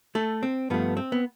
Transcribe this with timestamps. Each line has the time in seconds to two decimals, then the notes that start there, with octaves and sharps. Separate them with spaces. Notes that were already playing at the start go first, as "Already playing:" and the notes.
0.15 A3 A4
0.43 C4
0.70 G2 F3 A3 B3
0.97 C4
1.12 B3